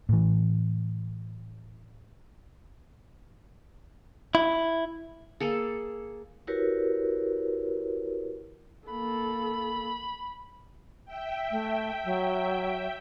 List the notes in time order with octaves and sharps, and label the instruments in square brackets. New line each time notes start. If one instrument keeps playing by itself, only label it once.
[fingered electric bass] A2 E3
[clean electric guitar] E4
[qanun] A#3 G#4 A4
[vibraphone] E4 F#4 G4 A#4 B4 C#5
[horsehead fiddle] A#3 A4 [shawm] B5
[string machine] E5 G5
[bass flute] A3
F#3